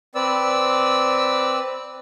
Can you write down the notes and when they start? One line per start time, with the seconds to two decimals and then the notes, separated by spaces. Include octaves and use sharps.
0.15 C4 B4 D5 E6